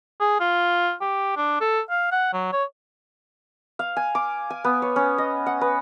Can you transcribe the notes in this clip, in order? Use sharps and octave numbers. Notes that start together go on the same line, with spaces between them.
G#4
F4
G4
D4
A4
F5
F#5
F#3
C#5
F5
G#5
D6
G#5
B3
C#5
C#4
D#5
F#5
B4